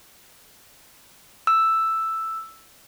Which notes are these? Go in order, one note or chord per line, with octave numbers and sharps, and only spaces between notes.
E6